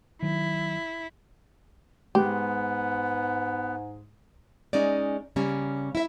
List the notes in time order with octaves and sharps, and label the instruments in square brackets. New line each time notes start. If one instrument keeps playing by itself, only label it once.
[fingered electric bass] D#3 F#3 [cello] E4
[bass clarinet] G#2 [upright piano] G#3 [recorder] B3 [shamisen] G4
[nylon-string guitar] G#3 C#4 D#4 D5
C#3 G3 A#3 C#4
E4 E5